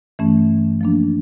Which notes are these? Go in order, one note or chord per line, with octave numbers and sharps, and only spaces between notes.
G2 E3 A3 C#4
F3 A#3 D4